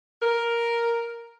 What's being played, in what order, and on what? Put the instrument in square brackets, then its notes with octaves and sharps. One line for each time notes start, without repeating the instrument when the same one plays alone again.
[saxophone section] A#4